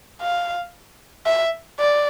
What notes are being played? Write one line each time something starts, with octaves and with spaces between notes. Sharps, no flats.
F5
E5
D5